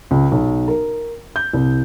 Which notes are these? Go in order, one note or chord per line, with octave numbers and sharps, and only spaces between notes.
C#2
B1
A#4
G6
C2